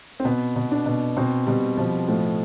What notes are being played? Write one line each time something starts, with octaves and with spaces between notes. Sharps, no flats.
C4
B2 B3
B2
D4
B2
B2 C4
B2 G3
B2 F3
A2 F3